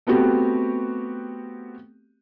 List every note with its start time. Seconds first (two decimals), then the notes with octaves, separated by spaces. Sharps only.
0.07 A3 B3 C4 F#4 G4